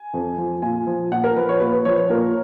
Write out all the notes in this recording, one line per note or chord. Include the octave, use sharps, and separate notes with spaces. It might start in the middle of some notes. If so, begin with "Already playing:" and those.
Already playing: G#5
F2
F3
A#2 G#5
F3
A#2 F#5
A#4
F3 B4
C#5
A#2 B4
B4
F3 C#5
C#5
A#2 A#4